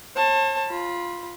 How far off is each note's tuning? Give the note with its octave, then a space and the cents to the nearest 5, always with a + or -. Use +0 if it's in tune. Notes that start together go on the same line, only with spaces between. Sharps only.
C#5 -45 A5 +15
F4 +0 B5 -25